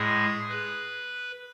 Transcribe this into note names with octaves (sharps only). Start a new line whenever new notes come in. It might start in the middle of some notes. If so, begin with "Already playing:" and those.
Already playing: A2 G#3 G#4
B4